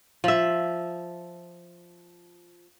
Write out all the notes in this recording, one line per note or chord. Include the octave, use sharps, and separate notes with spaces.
F3 E5